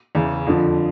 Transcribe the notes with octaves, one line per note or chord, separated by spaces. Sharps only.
E2 C#3 E3
F2 D3 F3